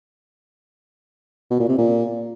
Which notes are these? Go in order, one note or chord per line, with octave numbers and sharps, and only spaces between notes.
B2
A#2
C3
A#2